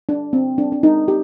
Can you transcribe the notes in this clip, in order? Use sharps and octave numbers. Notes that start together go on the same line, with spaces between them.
D4
C4
D4
D4
D#4
G4